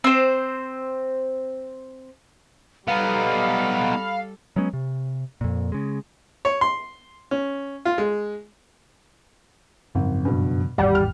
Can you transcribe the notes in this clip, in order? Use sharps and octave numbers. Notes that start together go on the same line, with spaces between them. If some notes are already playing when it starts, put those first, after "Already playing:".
C4 C5
G3 B3 D#4 A4 F5 B5
F#3 G#3 B3 C#4
C3
F2 A#2
C#3 G#3
C#5
C6
C#4
F4
G#3
G#1 F#2 C#3 F3
G2 B2
G#1 E2 A2 G3 F#5
F6